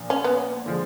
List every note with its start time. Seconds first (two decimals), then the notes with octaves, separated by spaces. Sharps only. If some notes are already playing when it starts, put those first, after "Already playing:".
Already playing: A#2 F3 A#3 D4
0.10 C#4
0.24 B3
0.66 D3 F3 G#3